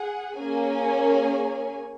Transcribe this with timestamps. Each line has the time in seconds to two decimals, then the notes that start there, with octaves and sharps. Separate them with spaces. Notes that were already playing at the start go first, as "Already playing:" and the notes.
Already playing: G#4 F#5
0.36 A#3 C#4 G#4 C#5 G#5